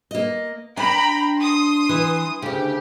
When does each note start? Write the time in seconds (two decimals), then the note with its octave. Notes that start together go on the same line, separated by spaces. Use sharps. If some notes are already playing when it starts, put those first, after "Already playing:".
0.11 A#3 D#5
0.77 D4 G5 A#5 B5
1.38 C6 D#6
1.89 E3
2.42 D2 C#3 G4